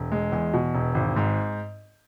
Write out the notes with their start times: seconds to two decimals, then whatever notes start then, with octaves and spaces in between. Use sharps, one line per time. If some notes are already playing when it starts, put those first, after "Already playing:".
Already playing: E1
0.12 G#3
0.32 E2
0.53 B2
0.74 E1
0.95 G#1
1.16 G#2